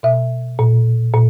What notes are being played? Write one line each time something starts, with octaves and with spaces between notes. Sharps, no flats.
B2 E5
A#2
A#2